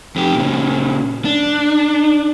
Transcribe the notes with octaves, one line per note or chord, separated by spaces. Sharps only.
F2 G4
A#2 C#3
D4